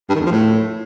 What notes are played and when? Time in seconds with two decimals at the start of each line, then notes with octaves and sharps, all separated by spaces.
0.09 G2
0.15 D#3
0.20 E2
0.26 F3
0.31 A2